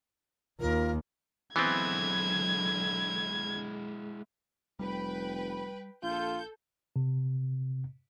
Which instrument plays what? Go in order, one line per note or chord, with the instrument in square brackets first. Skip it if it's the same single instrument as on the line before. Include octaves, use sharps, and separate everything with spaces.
[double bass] D#2 [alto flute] F4 [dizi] A#4
[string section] D3 F#3 [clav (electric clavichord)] E3 B3 C4 [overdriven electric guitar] G#3 E4 [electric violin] G#6
[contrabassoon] F1 [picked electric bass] G3 [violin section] B4 G5 B5
[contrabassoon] A#1 [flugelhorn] F4 [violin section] A4 G6
[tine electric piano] C3